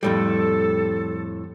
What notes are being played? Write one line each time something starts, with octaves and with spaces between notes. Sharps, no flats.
F2 A2 G3 A4